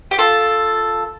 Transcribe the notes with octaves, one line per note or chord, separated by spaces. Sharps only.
G4
F4 A4